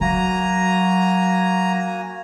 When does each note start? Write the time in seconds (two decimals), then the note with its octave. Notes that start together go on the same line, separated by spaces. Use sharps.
0.01 F#3 A#3 F#4 G#5 A#5